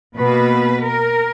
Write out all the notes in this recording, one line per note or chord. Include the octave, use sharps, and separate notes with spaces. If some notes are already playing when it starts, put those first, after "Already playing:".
B2 A#3 B4
A#4